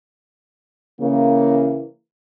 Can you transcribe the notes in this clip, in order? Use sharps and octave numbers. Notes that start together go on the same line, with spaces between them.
C#3 E3 A#3